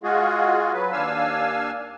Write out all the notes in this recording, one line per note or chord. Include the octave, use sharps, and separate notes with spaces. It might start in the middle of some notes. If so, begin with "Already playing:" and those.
G#3 F4 F#4 G#4
F#3 B4
D#2 D4 F5 G#5 E6